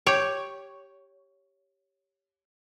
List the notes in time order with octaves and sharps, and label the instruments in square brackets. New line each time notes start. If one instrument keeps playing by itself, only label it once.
[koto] G4 C#5